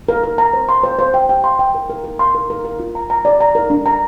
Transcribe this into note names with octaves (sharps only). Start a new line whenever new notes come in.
A#4
A#4
A#5
C5
C6
C5
C5
G5
G5
C6
G5
A#4
A#4
A#4
C6
A#4
A#4
A#4
F4
A#5
A#5
D5
A#5
A#4
D4
A#5